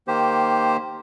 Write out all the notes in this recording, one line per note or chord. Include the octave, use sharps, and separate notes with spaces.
D#3 A#3 G4 C5